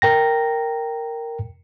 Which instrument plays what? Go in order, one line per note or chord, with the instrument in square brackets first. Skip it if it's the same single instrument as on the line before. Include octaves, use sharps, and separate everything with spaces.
[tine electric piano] A#4 G5 A#6